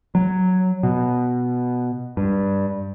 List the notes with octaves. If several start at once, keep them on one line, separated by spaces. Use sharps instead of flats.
F#3
B2
G2